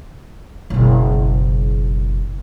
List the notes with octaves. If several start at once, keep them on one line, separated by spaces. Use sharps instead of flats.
F#1 B2